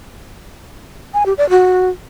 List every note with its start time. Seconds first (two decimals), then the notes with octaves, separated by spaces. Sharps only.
1.14 G#5
1.26 G4
1.38 D5
1.50 F#4